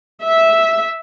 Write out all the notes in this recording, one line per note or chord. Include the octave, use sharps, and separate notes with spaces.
E5